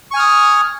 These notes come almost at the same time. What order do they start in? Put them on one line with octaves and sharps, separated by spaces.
C#6 G#5 F6 D#6